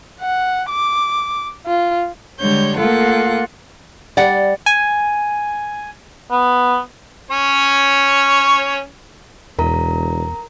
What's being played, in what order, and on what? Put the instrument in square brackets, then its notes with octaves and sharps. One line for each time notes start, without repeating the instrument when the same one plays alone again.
[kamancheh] F#5
D6
F4
[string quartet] D3 G3 G#3 C#5 G6
A3 A#3 F4 A4 F#5
[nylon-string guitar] G3 [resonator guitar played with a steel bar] D5 F#5
[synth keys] G#5
[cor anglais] B3
[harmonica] C#4 C#5
[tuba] E1 [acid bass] E2 [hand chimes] A#4 A#5